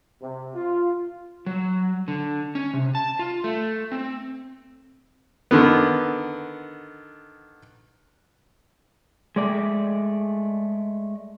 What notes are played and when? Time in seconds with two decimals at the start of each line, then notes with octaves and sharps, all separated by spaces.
0.22 C3
0.55 F4
1.46 F#3
2.08 D3
2.55 C#4
2.73 C3
2.95 A5
3.19 F4
3.44 A3
3.92 C4
5.51 D3 D#3 B3
9.36 G#3 A3 D5